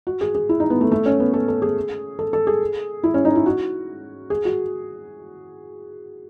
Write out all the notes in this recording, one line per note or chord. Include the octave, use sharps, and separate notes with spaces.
F#4
G#4
G#4
E4
D#4
B3
A3
A3
C#4
B3
A4
A4
G#4
A4
A4
G#4
E4
C#4
D#4
E4
F#4
G#4
F#4